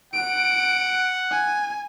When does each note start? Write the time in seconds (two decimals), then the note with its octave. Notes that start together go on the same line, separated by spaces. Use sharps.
0.14 F#5 D7
1.31 G#5